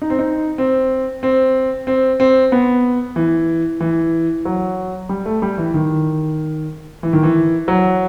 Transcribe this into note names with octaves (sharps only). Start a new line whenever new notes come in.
D#4
C4
D#4
C4
C4
C4
C4
B3
E3
E3
F#3
G3
A3
G3
E3
D#3
E3
D#3
E3
F#3